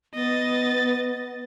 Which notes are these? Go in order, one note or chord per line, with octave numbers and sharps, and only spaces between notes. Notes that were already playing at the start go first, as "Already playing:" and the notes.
B3 D#5 A6